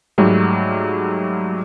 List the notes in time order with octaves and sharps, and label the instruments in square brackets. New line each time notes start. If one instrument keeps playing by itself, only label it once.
[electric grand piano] G#2 F#3 G3 A3